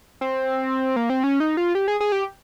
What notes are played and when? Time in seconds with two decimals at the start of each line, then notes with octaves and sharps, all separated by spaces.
0.21 C4
0.96 A#3
1.10 C4
1.24 C#4
1.40 D#4
1.57 F4
1.75 G4
1.88 G#4
2.00 G#4
2.12 G4